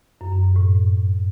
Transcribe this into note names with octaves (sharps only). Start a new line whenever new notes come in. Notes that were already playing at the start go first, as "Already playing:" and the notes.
F#2
F#2
G2
A2